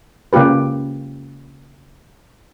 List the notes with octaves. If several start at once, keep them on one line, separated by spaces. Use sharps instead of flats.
C#3 A#3 F4 G4 B4